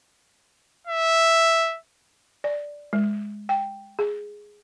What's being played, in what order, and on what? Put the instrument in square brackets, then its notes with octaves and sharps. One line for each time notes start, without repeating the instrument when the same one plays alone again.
[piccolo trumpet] E5
[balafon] D5
G#3
G5
G#4